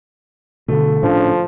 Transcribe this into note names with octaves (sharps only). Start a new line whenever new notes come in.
B2 D3 A3
A2 F3 C#4 D4